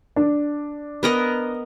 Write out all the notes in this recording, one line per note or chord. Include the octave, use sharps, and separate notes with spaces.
D4
B3 A#4 D#5